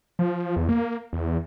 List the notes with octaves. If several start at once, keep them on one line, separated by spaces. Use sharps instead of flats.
F3
E2
A#3
E2